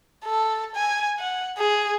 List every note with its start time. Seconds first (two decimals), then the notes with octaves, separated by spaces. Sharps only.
0.25 A4
0.75 G#5
1.19 F#5
1.58 G#4